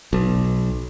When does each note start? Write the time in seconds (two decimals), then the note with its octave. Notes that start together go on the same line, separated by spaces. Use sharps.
0.13 B1